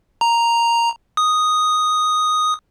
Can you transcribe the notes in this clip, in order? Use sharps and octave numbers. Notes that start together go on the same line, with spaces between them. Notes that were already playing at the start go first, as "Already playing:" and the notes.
A#5
D#6